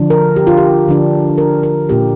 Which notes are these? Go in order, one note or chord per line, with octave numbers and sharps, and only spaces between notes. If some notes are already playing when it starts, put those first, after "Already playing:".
Already playing: D3 F3 D4
A#4
G4
F4
G4
D3 F3 D4 F4
A#4
A#4
A#2 A#3 D4 F4 G4